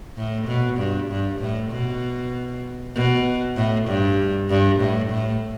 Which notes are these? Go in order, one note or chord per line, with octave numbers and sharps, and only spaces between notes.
A2
B2
G2
G2
A2
B2
B2
A2
G2
G2
A2
A2